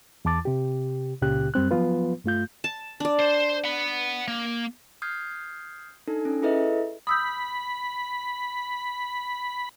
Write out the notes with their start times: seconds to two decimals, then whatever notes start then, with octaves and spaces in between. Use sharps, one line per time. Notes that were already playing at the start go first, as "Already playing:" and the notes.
0.25 E2 E3 A5 D6 A6
0.45 C3 G4
1.22 C#2 A#2 C#3 G4 F#6
1.54 F#2 G3 C4 F#6
1.71 F3 F#3 B3 F4 B4
2.24 G2 A3 F4 G6
2.64 A5
3.00 D4 D5
3.20 C5
3.64 F#5 B5
4.28 A#3
5.02 D#6 F6 G6 G#6 C7
6.08 D4 D#4 A4
6.25 C#4
6.42 E4 G#4 A4 B4 D#5 E5
7.07 B5 D#6 E6 G6